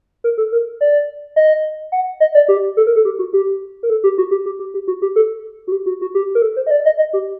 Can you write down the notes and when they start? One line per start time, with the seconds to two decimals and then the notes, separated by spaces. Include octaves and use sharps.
0.24 A#4
0.38 A4
0.52 A#4
0.81 D5
1.36 D#5
1.92 F#5
2.20 D#5
2.35 D5
2.48 G4
2.77 A4
2.87 A#4
2.96 A4
3.05 G4
3.19 F#4
3.33 G4
3.83 A#4
3.90 A4
4.04 G4
4.18 F#4
4.31 G4
4.46 G4
4.59 G4
4.74 G4
4.88 F#4
5.02 G4
5.16 A4
5.67 F#4
5.72 G4
5.86 F#4
6.02 F#4
6.15 G4
6.35 A#4
6.42 A4
6.56 C5
6.67 D#5
6.71 D5
6.86 D#5
6.99 D#5
7.13 G4